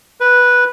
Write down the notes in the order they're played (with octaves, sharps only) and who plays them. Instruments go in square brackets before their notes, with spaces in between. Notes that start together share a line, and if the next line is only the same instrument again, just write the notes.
[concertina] B4